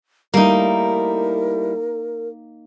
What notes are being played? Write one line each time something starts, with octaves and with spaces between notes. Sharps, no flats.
G3 A3 A#3 D#4 E4 A#4